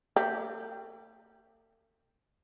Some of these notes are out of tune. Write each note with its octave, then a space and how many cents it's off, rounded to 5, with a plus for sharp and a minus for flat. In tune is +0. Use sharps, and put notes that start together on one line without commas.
A3 +45 G4 +0